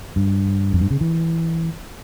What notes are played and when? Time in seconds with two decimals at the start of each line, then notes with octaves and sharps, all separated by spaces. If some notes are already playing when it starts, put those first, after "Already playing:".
0.16 G2
0.73 F2
0.80 G2
0.91 C#3
1.01 E3